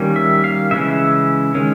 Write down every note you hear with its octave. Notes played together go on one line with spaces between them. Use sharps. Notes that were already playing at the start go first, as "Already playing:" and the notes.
Already playing: D#3 G3 A#3 C#4
E5
F5
C#3 E3 G#3 C#4 E5
D#3 G#3 C#4